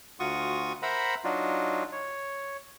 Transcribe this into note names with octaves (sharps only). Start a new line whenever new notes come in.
D2 F4 F#4 C#6 D#6
A#4 C5 E5 F#5 A#5 B5
F#3 D4 D#4 F4 F#4
C#5